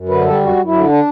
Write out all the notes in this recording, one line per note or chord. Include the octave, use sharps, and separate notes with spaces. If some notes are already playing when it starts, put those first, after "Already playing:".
Already playing: F#2
D3 B4
G3 A4
F#2 F#4
F#2
E4
D3
D4